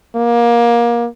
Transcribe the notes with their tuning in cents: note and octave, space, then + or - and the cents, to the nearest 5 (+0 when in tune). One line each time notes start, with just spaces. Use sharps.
A#3 +25